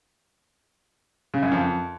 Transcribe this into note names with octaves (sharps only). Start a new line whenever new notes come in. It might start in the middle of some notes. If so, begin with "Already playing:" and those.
C#3
F#2
F2